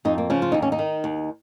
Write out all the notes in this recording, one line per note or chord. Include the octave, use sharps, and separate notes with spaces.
F2 D#4
A#3
C#3 F3 C#4
F4
D#2 D#4
C#4
D#4
D#3
D#2